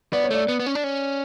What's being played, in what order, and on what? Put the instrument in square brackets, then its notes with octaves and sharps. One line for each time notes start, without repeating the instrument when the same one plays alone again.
[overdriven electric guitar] B3 [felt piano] D5
[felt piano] C#5
[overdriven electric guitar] A3 [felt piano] D5
[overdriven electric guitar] B3
B3
C#4
D4
C#4